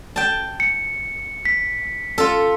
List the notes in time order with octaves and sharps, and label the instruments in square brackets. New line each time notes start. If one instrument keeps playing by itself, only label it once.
[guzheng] G5 A5
[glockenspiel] C#7
B6
[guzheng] F4 A4